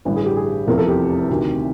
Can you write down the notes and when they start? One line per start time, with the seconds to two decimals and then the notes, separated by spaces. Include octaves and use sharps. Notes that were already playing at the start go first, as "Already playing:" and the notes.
0.05 A1 G2 D3 B4
0.16 G#4
0.26 G4
0.36 G#4
0.67 F1 E2 C3 F3 A#4
0.78 A4
0.88 G4
1.29 D2 C3 D#3